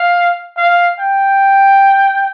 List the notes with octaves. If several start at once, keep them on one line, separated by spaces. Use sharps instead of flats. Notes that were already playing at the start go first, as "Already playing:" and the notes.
Already playing: F5
F5
G5